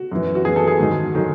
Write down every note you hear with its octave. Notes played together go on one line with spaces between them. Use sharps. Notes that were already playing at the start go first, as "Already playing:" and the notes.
Already playing: F#4
F#2 E3
F#4
F#2 E3 G#4
A4
G#4
G#2 D#3 F#3
D#3 F#3